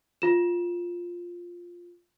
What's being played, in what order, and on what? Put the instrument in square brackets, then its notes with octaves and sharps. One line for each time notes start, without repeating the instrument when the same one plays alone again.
[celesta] F4 E7